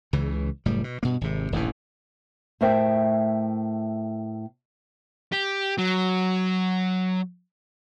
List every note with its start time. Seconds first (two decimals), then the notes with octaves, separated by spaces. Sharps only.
0.13 C#2 C#3 E3
0.65 F#1 A2 G3
0.84 B2
1.03 G2 B2 A#3
1.21 G#1 C3
1.52 D#1 A1 G2 E3
2.61 A2 A3 A#4 C5 E5 G5
5.32 G4
5.79 F#3